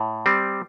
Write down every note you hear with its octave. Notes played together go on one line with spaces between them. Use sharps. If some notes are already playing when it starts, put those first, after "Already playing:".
Already playing: A2
G3 C4